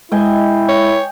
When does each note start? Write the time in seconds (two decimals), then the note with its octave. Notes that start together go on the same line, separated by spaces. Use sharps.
0.12 G#3 E4 D#5 G5 G#5
0.69 C#5